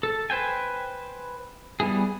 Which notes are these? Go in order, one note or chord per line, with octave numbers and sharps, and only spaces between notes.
A4
B4 C5 G5 G#5
G3 B3 E4 G#4